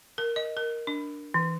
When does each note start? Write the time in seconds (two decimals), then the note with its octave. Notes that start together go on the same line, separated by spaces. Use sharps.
0.18 A#4
0.36 D#5
0.57 A#4
0.87 D4
1.34 E3